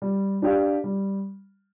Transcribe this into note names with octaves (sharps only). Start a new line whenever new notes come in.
G3
D4 G4 D5 F5
G3